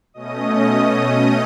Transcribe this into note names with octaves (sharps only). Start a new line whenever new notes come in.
B2 A3 C#4 D#5 D#6